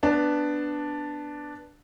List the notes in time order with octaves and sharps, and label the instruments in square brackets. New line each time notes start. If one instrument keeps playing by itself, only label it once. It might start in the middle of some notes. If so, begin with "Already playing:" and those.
[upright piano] B3 D4 A5